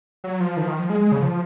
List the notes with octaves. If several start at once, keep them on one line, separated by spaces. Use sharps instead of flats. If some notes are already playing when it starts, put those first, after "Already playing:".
F#3
F3
D#3
F3
D#3
F3
G#3
G#3
C#3
F3